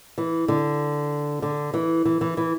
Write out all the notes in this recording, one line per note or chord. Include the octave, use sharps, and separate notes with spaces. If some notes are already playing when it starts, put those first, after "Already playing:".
E3
D3
D3
E3
E3
E3
E3